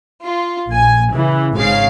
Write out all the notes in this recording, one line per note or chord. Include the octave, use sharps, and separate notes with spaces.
F4
A#1 G#5
C#3 E3
G#1 G#2 C#3 C#4 F5 C7